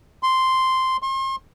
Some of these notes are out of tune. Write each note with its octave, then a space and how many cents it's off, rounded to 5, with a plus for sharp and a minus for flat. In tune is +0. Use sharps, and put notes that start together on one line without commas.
C6 -5
C6 +40